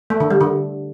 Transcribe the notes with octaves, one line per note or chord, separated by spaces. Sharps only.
A3
D3
G3
D3